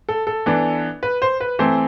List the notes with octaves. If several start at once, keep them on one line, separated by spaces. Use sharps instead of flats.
A4
A4
E3 B3 D4
B4
C5
B4
E3 A3 C4 C5